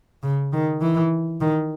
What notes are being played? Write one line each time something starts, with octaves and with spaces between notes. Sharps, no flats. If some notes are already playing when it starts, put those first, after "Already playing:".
C#3
D#3
E3
D#3